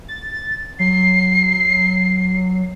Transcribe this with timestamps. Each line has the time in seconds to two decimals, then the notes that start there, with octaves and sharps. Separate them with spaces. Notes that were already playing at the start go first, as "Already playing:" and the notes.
0.08 A6
0.80 F#3 C7